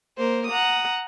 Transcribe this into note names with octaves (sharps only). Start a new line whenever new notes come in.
A#3 A#4 C5
F#5 A#5 D#6